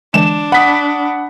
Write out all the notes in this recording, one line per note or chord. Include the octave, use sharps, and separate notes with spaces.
D3 E3 G#3 D4 E7
F#5 B5 D#6 B6